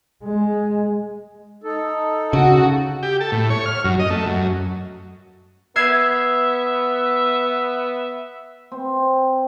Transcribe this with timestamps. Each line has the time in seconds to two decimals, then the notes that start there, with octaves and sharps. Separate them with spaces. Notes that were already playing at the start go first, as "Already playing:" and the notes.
0.23 G#3
1.64 D#4 A4
2.33 C#3 F#4
3.03 G4
3.20 A4
3.32 A2
3.50 C#5
3.66 F6
3.84 F#2
3.99 D#5
4.10 A3
4.26 F#2
5.76 B3 E5 E6 G#6 C7
8.72 C4